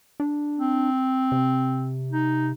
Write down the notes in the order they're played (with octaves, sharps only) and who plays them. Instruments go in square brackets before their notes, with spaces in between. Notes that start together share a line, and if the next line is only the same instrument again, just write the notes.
[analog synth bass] D4
[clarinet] C4
[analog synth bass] C3
[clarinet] D#4